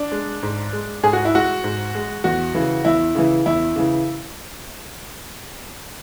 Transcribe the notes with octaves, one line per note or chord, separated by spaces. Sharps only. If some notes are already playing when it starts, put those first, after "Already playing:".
Already playing: D4
G#3
G#2
G#3
G#2 G#4
F#4
E4
G#3 F#4
G#2
G#3
E2 F#4
C#3 E3
E2 E4
C#3 E3
E2 E4
C#3 E3